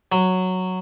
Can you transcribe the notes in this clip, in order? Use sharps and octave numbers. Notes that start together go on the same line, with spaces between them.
F#3